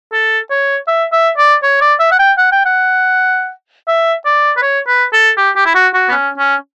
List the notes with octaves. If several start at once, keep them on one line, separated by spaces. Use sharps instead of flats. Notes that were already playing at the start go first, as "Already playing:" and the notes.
A4
C#5
E5
E5
D5
C#5
D5
E5
F#5
G5
F#5
G5
F#5
E5
D5
B4
C#5
B4
A4
G4
G4
E4
F#4
F#4
B3
C#4
C#4